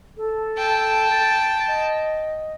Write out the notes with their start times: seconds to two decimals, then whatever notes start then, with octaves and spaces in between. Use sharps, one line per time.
0.17 A4
0.58 G5 A5
1.11 A6
1.68 D#5